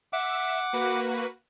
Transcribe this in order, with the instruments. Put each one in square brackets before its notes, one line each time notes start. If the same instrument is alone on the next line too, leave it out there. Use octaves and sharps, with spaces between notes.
[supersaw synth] E5 [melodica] F#5 D6
[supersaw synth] A#3 F#4 B4